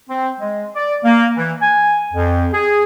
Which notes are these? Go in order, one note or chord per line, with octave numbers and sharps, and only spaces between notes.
C4
G#3
D5
A#3
E3
G#5
F2
G#4